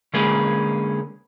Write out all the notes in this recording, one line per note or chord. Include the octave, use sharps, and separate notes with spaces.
D3 G#3 A#3 C#4 G#4 B4